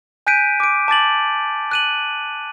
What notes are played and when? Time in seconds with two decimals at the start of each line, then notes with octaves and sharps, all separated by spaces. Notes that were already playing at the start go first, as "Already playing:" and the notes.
0.27 G#5 F#6 G6 B6 D7 D#7
0.60 D6 D7
0.88 A5 D6 A6 F#7
1.71 F#6 D#7 F#7